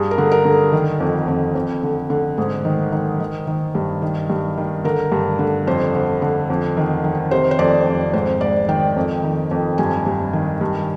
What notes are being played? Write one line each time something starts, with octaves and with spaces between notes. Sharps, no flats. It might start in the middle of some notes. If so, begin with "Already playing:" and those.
Already playing: G2 G#4
A#4
D3
A#4
D3
D#3
F2
F2
F2
D3
D3
G#2 G#4
D#3
D#3
D#3
D#3
G2
D#3
G2
D#3
D3 A#4
G2
D3
F2 C5
D3
D3
F2
D#3
D#3
C3 C5
C5
F2 D5
F2
G#2 C5
G#2 D5
D#3 G5
F2
D#3
F2
G2 G#5
G2
D#3
G2